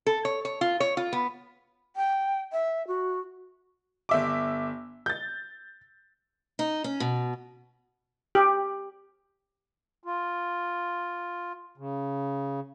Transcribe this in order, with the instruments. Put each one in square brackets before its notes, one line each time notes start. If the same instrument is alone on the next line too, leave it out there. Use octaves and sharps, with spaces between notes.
[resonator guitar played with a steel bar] A4
C#5
C#5
F4
C#5
F4
B3
[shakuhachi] G5
E5
F#4
[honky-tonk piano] G1 E5 D6
G6 A6
[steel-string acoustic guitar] D#4
C#4
B2
[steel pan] G4
[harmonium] F4
C#3